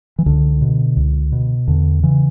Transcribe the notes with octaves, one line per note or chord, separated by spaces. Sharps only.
E3
C#2 D3
B2
C#2
B2
E2 D3
C#3 E3